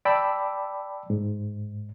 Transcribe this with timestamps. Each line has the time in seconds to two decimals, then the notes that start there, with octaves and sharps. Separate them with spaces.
0.05 D5 G5 A5 B5 D6 E6
1.10 G#2